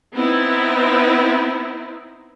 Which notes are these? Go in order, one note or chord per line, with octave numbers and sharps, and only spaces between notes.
B3 C4 D#4 E4